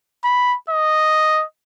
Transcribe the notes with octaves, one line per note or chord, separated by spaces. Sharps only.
B5
D#5